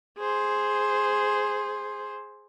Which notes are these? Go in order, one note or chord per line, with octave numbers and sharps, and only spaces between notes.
G#4 C5